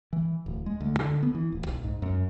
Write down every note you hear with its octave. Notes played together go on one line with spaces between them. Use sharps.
E3
D1
G#3
D2
D3
B3
E3
D1
B1
G#2
F#2